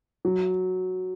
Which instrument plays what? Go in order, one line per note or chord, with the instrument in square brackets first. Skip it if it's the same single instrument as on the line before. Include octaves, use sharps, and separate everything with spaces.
[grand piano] F#3